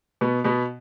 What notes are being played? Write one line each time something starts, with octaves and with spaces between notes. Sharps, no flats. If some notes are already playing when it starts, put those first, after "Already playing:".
B2 B3
B2 B3